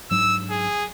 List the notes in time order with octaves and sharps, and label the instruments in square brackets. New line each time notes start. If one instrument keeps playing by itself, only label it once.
[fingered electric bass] G#2 F#3 D4 [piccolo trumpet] E6
[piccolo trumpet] G#4